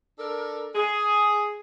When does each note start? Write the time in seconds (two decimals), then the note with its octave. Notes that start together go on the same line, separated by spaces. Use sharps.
0.19 D4 A4 A#4
0.75 G#4